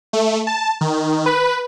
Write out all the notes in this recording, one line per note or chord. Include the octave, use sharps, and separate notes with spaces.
A3
A5
D#3
B4